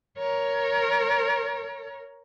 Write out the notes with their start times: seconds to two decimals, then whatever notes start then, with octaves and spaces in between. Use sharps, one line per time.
0.18 A#4 C#5